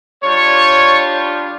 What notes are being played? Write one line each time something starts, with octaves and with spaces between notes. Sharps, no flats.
G3 D4 F4 C#5